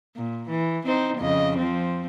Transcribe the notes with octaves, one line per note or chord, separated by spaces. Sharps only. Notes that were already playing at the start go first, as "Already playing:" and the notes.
A#2
E3
C4 D#4 C5
F2 C#3 D#5
F3 C4